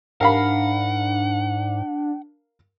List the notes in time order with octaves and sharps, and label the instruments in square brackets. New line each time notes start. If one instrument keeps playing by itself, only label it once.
[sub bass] G#2 [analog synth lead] D4 [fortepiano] A#4 F5 B5 [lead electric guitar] F#5